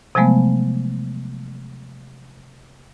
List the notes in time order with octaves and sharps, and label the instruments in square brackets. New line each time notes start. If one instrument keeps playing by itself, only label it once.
[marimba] C3 F3 F#3 G#3 A3 B3